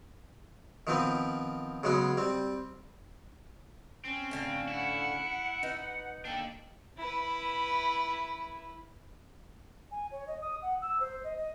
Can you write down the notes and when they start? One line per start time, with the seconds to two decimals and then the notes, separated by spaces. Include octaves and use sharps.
0.87 D#3 F3 B3 C4 B4
1.83 C#3 F#3 G#3 B3 C#4
2.17 G3 C4
4.05 C4 C#4
4.31 A2 D3 F5
4.68 E4 F#5
5.63 D#4 B4
6.25 A#3 D4 A4 G5
6.97 E4 B4
9.91 G#5
10.11 C#5
10.27 D#5
10.41 D#6
10.62 F#5
10.81 E6
11.00 C5
11.24 D#5
11.37 D#5